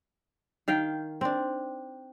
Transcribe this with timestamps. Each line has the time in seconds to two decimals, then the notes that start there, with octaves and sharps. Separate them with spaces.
0.68 D#3 F5 G5
1.21 C4 D4